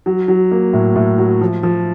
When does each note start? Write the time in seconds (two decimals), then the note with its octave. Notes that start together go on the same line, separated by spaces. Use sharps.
0.06 F#3
0.28 F#3
0.52 A#3
0.73 A2
0.96 A2
1.18 F#3
1.41 F3
1.63 F3